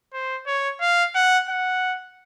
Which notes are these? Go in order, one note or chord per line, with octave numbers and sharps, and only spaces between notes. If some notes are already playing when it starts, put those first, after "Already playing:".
C5
C#5
F5
F#5
F#5